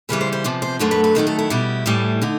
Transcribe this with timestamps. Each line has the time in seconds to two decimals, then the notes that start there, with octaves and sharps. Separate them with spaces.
0.09 D#2 C#3 E3 G3 B4
0.21 C5
0.32 C5
0.44 E2 C3 F3
0.62 C5
0.79 F#2 D3 F#3 A3 C5
0.91 B4
1.04 B4
1.15 D#2 D#3 F#3 A3 A#4
1.27 A4
1.39 E4
1.50 E2 B2 G3
1.86 A2 E3 G3
2.22 D3 D#4